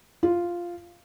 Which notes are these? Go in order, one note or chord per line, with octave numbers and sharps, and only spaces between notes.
F4